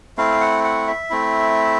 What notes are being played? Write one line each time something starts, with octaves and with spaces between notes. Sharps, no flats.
A3 C4 E4 F5
F#5
F#5
E5
A3 C4 E4